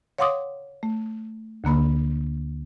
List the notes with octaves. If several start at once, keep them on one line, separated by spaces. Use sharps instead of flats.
C#5 F5 F#5 C6 D6 D#6
A3
D2 D3 A#3 B5